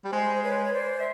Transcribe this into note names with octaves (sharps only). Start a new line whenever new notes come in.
G3
G#3 C5
B4 C#5
C#5
C5 D5
E5